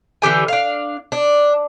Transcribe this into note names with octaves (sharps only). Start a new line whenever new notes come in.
D3 E3 G4 G#5
D4 F5
D4